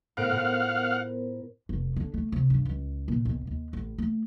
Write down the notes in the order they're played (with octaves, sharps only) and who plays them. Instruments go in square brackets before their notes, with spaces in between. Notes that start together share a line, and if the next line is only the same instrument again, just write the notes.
[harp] A2 D7 [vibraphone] B3 A#4 C5 [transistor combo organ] F5 F#5
[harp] A2 F4
[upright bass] F1
D3
A3
C3
G2
C#2
A#2
B1
D#2
A1
A3